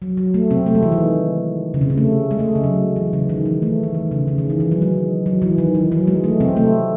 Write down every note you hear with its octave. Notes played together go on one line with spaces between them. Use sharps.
F#3
F#3
A3
C3 C4
A3
G#3
E3
D#3
C#3
C3
C#3
A3
G#3
A3
C#3
F#3
E3
C#3
D#3
E3
A3
E3
D#3
C#3
C#3
D#3
E3
E3
F#3
G#3
F#3
E3
D#3
E3
F#3
G#3
A3
C3 C4
A3